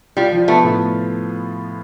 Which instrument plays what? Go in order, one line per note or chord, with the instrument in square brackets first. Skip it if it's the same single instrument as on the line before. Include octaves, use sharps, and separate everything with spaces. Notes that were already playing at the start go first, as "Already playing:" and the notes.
[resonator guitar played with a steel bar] G3 [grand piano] F4
[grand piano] F3
[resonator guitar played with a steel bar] A3 [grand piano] B3
[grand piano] A2